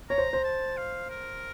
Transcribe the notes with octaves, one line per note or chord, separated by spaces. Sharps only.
C#5 A#5
C5
C5
A5
F5
A#4